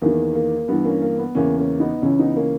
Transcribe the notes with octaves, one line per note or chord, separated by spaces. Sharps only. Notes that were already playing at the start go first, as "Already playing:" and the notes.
E2 D#3 A#3
A#3
G2 E3 B3
A#3 C#4
A#3
B3
E2 C#3 E3 A#3 C#4
A#3 C#4
B3 D#4
C#2 C#3 E3 C#4 E4
B3 D#4
A#3 C#4